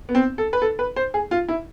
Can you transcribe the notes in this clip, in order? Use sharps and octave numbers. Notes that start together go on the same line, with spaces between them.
B3
C4
A4
B4
A4
B4
C5
G#4
F4
E4